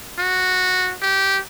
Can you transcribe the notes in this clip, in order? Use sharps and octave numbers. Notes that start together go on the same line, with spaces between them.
F#4
G4